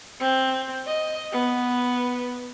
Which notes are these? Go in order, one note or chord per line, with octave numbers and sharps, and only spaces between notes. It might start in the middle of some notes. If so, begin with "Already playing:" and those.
C4
D#5
B3